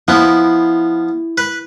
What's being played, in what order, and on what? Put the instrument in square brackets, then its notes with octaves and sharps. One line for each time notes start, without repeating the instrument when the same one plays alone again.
[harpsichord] F3 B3 [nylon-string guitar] E4
[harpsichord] B4